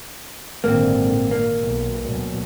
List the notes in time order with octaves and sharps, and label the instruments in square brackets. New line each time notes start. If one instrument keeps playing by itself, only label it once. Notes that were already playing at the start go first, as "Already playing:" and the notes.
[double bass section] G#1 A#2 D3 [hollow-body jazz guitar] A#3 C4
[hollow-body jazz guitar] A#3
[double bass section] B1
D2 B2 F#3